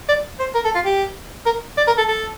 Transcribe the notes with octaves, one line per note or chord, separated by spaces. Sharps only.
D5
C5
A#4
A4
F4
G4
A#4
D5
A#4
A4
A4